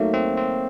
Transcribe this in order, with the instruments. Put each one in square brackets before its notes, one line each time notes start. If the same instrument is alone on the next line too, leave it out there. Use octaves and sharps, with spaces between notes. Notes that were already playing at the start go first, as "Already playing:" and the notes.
Already playing: [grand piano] F#3 A3 D#4 [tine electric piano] A#3
[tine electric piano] C4
C4